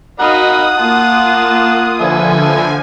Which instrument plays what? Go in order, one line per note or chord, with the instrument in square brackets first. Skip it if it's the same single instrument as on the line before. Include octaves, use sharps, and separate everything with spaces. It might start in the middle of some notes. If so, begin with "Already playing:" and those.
[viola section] D#4 F#4 F5 [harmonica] A#4 D#5 B5 [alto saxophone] F#5 [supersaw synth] D#6
[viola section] A#3 F4 [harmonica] A5
[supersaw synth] D3 F3 G#5 [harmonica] A4 B4 E5